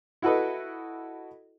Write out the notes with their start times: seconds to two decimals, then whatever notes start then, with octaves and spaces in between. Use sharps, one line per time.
0.22 E4 F#4 A4 B4 D#5